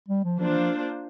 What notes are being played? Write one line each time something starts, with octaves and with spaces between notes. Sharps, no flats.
G3
F3
F3 A#3 D4 F4 C5
E3
F3